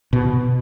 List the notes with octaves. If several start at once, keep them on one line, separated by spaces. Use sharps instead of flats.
B2